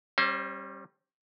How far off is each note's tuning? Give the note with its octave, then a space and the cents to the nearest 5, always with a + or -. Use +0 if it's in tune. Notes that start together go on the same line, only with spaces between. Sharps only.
G3 +0 C#4 -40 C5 +10